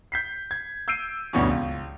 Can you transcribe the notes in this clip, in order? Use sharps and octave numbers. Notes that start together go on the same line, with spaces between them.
G6 B6 C7
G#6
E6 G6 C7 D7 D#7
D2 G2 B2 E3 B3 C#4
C#2